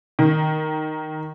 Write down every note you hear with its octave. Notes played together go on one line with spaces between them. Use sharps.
D#3